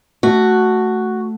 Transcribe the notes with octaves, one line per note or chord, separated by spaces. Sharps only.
A3 F#4